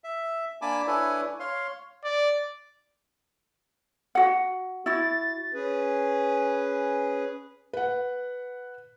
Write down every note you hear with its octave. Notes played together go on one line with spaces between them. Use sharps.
E5
A#3 D4 G#5 A5 B5 D6
D4 E4 A4 B4 C#5 G#5
C#5 F5 C6
D5
F#4 F#5
E4 F#4 A6
C#4 G#4 B4
B4 F#5